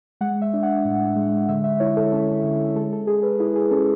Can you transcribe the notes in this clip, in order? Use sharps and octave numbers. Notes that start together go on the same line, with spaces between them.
G#3 F#5
E5
D4
F#5
A2
G#3
D3 E5
E5
E4 C#5
A4
C#4 A4
D3
G#3 A4
A4
G#3 G#4
B4
E4 G#4
G#4
C#4 A4